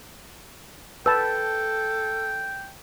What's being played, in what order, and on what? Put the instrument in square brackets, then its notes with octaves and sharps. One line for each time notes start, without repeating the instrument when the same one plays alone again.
[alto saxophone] A4 [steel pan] B4 A5 [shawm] G5 [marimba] E6